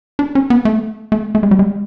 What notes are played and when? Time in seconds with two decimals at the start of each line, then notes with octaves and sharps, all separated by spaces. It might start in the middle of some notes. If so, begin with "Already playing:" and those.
0.19 D4
0.35 C#4
0.50 B3
0.65 A3
1.12 A3
1.35 A3
1.43 G#3
1.51 G3
1.59 G#3